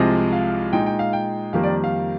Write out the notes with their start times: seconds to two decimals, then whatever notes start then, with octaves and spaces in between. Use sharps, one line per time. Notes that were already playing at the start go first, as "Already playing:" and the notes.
Already playing: C2 C3 F3 G#3 D#5
0.33 F5
0.73 A#2 G#3 D#4 G5
0.86 G5
0.99 F5
1.13 G5
1.53 F2 D#3 G3 A#3 F5
1.63 D5
1.84 F5